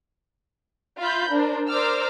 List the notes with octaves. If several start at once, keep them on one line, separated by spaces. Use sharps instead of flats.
F4 E5 F5 B5 G6
D4 A#4 C5
A#4 C5 D5 D6 E6 F6